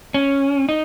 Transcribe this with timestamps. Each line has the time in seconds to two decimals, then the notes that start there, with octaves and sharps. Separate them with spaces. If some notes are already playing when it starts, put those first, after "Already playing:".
0.14 C#4
0.69 D#4